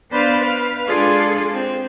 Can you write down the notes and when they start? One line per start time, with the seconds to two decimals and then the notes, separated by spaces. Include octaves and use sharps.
0.10 B3 D4 B4 C5 D5 F5
0.41 B4 F5
0.86 G#3 D4 F4 G#4 A4 D5
1.51 C4